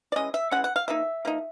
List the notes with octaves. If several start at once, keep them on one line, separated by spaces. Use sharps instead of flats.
D5
E3 G#3 C#4 D#5
E5
E3 G#3 C#4 F#5
F#5
F5
F3 A#3 D#4 E5
F3 A#3 D#4